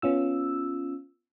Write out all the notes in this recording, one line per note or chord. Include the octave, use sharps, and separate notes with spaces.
B3 C#4 F4 E6